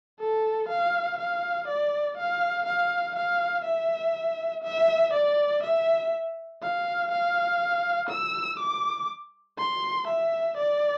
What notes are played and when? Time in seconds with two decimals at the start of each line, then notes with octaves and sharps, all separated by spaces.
0.19 A4
0.69 F5
1.19 F5
1.68 D5
2.17 F5
2.66 F5
3.16 F5
3.65 E5
4.64 E5
5.14 D5
5.63 E5
6.62 F5
7.12 F5
8.09 E6
8.60 D6
9.58 C6
10.07 E5
10.57 D5